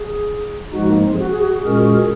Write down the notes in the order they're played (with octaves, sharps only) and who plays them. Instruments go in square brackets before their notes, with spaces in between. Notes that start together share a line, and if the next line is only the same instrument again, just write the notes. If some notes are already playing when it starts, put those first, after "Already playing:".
Already playing: [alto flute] G#4
[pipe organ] G#2 F3 G#3 D#4 [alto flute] F#4
[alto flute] A#3
C4
G#4
F#4
G#4
F#4
G#4
[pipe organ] A#2 G#3 C#4 F#4 A#4